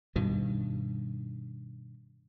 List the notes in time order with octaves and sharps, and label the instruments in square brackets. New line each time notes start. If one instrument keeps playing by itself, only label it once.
[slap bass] G2 B2 D#3